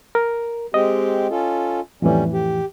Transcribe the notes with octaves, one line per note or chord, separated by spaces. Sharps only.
A#4
G#3 C4 G4 D#5
C#4 F4 A4
F2 A2 E3 G3 C#4
G4